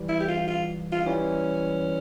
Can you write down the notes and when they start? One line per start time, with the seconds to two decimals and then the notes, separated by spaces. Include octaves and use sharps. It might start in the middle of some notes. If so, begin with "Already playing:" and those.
Already playing: E3 G3
0.09 E4
0.21 G4
0.29 F4
0.48 F4
0.92 F4
1.06 E3 G3 C#4